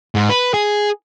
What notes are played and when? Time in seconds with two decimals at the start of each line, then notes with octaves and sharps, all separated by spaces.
0.15 G#2
0.30 B4
0.54 G#4